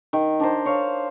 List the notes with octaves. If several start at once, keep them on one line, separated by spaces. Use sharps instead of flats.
D#3
D4 A#4 C5
C5 C#5 F5